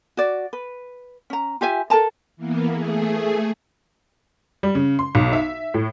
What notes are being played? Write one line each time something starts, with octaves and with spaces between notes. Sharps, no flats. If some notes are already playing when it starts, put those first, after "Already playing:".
F#4 D5
B4
C#4 A#5
F4 G4 E5 G#5
A4 A#4 A5 A#5
E3 A#3 B3
A3 G#4
G3
C#3
C6
B1
E5
A2